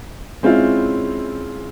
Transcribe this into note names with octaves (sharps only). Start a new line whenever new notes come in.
G#3 C4 C#4 E4 F4